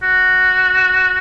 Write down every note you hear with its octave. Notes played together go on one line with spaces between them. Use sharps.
F#4